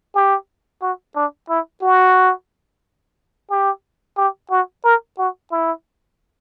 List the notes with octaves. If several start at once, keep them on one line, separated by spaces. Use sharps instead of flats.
G4
F#4
D4
E4
F#4
G4
G4
F#4
A#4
F#4
E4